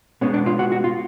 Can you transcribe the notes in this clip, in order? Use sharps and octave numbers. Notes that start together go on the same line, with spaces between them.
B2 G#3 B3 C#4
D4
F4
F#4
F#4
F4